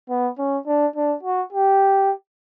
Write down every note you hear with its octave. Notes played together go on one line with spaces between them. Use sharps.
B3
C#4
D4
D4
F#4
G4